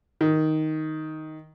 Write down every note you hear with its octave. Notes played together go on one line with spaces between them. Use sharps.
D#3